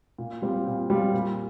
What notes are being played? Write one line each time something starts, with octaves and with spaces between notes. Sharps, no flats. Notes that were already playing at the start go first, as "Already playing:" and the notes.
A#2
G3 C4 F4
A#2
G3 C4 F4
A#2